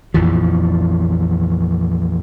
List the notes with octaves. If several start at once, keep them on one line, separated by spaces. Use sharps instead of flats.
A#1 F2 E3 F3